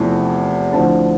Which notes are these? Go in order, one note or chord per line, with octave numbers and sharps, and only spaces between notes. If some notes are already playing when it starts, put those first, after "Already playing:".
Already playing: E2 C3 F3 A3 E4
D2 D3 F3 C4 E4 A5